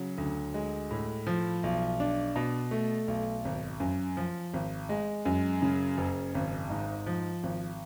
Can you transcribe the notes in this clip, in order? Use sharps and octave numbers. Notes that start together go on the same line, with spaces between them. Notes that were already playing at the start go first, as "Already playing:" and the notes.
Already playing: C#3 F#3
D2
G#3
A2
F3
B1
D4
B2
A3
B1
G#1
F#2
F3
G#1
G#3
F#2
C#3
F#1
G#1
G#2
F3
G#1